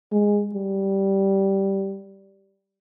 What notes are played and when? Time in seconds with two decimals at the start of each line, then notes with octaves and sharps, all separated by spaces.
0.12 G#3
0.55 G3